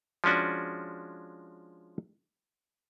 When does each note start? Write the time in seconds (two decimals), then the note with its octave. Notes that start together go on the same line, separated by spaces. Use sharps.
0.24 F3 G#3 C#4 D4 F#4